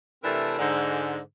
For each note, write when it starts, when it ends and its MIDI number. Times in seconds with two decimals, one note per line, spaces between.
0.24 0.58 48
0.24 0.58 52
0.24 0.58 57
0.24 0.58 60
0.24 0.58 62
0.24 0.58 70
0.59 1.18 44
0.59 1.18 50
0.59 1.18 56